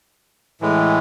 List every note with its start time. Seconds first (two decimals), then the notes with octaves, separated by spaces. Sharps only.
0.61 A2 E3 G#3